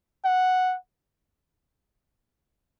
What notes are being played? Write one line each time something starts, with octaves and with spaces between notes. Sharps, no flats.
F#5